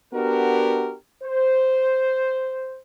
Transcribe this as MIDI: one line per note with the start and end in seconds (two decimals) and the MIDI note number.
0.14 0.94 59
0.14 0.94 62
0.14 0.94 66
0.14 0.94 67
0.14 0.94 70
1.23 2.79 72